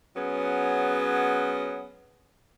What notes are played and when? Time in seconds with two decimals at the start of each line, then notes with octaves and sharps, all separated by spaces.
0.16 F#3 B3 C#4 G#4